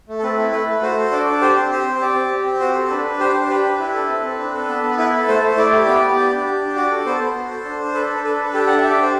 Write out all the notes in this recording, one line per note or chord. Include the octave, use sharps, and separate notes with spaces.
A3
A4
C4 B4
E4
A3 B4
A3
F#4 C5
A4
D4 D5
D4
G4 C5
C4
G4 C5
C4
G4 D5
C4
G4
C4
F#4 C5
A4
D4 B4
D4
G4 C5
D4
G4 B4
D4
E4
A4
C4
C4
D4
A4
B3
B3
E4 B4
A4
A3 C5
A3
E4 D5
G4
B3 D5
B3
G4
D4
G4
D4
F#4 D5
A4
B3 C5
B3
F#4
A4
D4
D4
A4 B4
D4
A4 B4
D4
G4 A4
D4 F#5
E5
G4
D5
D4 C5